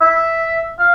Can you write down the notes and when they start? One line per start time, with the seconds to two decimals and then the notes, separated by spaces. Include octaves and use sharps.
0.01 E5
0.79 F5